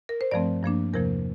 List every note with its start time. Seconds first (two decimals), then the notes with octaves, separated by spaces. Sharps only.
0.09 A#4
0.21 C5
0.31 G2 F3 A3 C4 D5
0.63 G2 F3 A#3 D4
0.93 E2 C3 F3 A#3 A#4